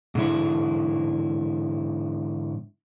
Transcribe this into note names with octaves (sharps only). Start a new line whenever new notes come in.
G#2 D3 E4